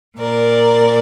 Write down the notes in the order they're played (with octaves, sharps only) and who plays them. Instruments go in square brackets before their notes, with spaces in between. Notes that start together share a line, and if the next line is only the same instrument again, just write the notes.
[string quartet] A#2 A#4 D5